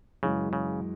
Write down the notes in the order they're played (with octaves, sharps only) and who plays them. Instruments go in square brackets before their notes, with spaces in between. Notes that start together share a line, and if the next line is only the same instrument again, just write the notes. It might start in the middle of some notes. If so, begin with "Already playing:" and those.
[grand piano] F#2 E3 G#3 [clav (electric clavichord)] C#3
[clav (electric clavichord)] C#3